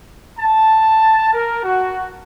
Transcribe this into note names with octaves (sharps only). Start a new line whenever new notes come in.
A5
A#4
F#4